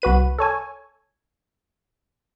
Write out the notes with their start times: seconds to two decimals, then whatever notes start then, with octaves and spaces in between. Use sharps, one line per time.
0.02 C2 F#4 B4 D#7
0.39 A4 C#5 G#5